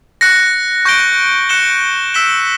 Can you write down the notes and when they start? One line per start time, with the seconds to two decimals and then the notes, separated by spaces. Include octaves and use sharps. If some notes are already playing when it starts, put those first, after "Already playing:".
0.21 F#6 A#6 C#7
0.85 C#6 G6 A#6 D7 G7
1.49 F#6 C#7 E7 G7
2.14 E6 B6 E7 G7